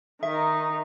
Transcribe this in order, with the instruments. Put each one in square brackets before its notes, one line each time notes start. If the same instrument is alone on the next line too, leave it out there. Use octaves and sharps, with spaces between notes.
[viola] D#3 D#4 [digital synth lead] E5